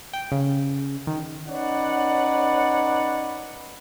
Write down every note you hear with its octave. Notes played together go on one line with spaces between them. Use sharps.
G5
C#3
D#3
C#4 D#4 B4 C#5 D5 F#5